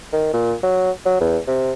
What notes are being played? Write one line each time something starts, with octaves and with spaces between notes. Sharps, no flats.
D#3
A#2
F#3
F#3
E2
C3